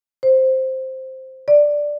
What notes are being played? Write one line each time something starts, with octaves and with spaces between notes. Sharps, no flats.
C5
D5